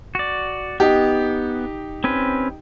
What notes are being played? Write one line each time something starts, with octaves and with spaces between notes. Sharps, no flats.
F#4 D5
B3 D#4 G4
C4 C#4 B4